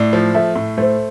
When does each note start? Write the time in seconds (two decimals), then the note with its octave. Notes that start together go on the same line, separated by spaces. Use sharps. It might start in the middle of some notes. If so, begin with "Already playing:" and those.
Already playing: A2 D5
0.13 F3
0.34 A3 E5
0.56 A2
0.78 A3 C5